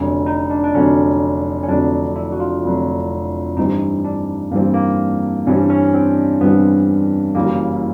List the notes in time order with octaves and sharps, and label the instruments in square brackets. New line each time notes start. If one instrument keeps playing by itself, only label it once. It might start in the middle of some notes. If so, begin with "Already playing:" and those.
Already playing: [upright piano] F1 F2 D3 F#3 [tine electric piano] C#4
[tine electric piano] D#4
D4
D4
[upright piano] F1 F2 D3 F#3 [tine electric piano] C#4
[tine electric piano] C#4
[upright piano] F1 F2 D3 F#3 [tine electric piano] D4
[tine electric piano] E4
F#4
F4
[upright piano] F1 F2 D3 F#3
[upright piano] G2 E3 G3 C4 [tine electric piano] D#4
[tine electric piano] D4
[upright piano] G2 E3 G3 C4 [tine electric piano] A#3
[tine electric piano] A#3
[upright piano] G2 E3 G3 C4 [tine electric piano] C#4
[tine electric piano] C#4
C4
[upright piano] G2 E3 G3 C4 [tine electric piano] B3
[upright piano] F#1 F#2 C#3 E3 G3 [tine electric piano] A#3